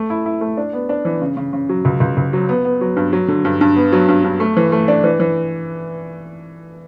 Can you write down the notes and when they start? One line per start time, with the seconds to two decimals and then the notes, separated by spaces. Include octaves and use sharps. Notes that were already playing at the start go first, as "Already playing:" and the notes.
Already playing: A3
0.10 E4
0.26 E4
0.41 A3
0.57 D4
0.73 B3
0.89 D4
1.05 E3
1.21 C#3
1.37 C#3
1.53 C#3
1.69 F#3
1.85 C#2
2.00 C#2
2.17 C#2
2.33 F#3
2.49 B3
2.65 B3
2.81 F#3
2.96 G2
3.13 F#3
3.28 D3
3.45 G2
3.61 G2
3.76 B3
3.92 F#3
4.08 G2
4.24 G2
4.40 A3
4.57 E3
4.72 A3
4.88 D4
5.04 E3
5.20 E3